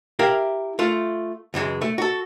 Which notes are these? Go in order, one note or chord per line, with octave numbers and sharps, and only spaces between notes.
E4 G4 A#4 F5
A3 F4
C#2 F#2 E3 G#3
A3
F#4 A4